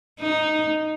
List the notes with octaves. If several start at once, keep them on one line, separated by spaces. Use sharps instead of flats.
D#4